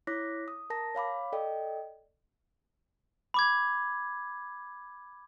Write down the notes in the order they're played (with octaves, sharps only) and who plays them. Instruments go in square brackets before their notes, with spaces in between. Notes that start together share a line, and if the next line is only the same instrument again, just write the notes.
[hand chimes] E4 C#5 D6 F#6 A#6 B6
D#6
A#4 A5 A#6
C#5 F5 B5 D6
A4 D5 D#5 G5
[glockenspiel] B5 D6 G#6